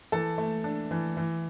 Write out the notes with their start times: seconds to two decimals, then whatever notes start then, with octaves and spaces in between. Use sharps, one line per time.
0.12 E3 A4 A5
0.38 A3
0.64 D4
0.91 E3
1.17 E3